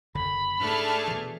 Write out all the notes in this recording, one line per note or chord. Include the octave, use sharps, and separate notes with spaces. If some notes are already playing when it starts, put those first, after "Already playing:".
F#1 D3 B5
G#2 A3 D4 G#4 A5 F6
B2 E3